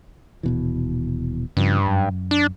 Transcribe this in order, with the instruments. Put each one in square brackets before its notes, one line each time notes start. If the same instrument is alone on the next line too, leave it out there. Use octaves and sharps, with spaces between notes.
[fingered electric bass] D#1 B2 E3
[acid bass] G2 [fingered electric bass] C#3 F3
[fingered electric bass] F#2
[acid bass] D4